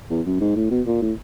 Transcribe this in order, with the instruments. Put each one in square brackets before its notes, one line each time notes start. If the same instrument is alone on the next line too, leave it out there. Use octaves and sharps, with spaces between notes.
[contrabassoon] E2
F#2
G#2
A2
B2
A#2
A2